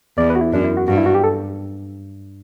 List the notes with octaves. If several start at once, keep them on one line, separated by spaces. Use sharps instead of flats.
E2 D5
B4
F#4
E4
F#2 D4
E4
F#4
G2 F#4
E4
F#4
G4
A4